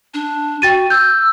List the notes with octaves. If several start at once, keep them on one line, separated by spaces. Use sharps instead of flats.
D4
F#4 G5 A6 D#7
E6 G6